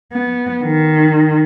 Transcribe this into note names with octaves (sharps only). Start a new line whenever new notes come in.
B3
D#3